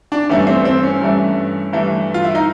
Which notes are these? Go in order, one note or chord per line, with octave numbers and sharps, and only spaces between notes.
D4
G2 E3 A3 C#4
C4
C4
C#4
G2 E3 A3
G2 E3 A3
F4
E4
D#4